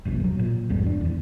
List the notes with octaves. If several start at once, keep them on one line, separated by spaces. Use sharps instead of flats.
F1 A#1 G2 B2
E3 F#3
A#2
B1 F2 G#2 G3
E1 D4
E2 E3